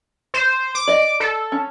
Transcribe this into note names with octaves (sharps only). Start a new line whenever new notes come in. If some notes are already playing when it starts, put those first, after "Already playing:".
C5
D6
D5 D#5
A4
C#4